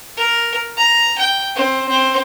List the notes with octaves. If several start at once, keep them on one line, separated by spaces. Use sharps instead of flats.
A#4
A#5
G5
C4
C4